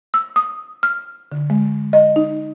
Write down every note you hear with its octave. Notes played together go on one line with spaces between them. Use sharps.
E6
D#6
F6
D3
G#3
D#5
D#4